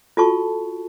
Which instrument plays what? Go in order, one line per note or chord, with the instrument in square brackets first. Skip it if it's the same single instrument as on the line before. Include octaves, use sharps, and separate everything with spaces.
[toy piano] F4 F#4 A4 A5 C#6